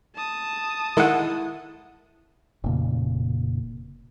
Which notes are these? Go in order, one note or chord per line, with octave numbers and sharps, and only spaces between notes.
A5 D#6
D#3 G#3 E4 A4 A#4 F#5
F1 A#2 C#3